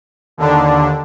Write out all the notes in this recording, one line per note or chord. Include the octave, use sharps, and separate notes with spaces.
D#2 D3 D4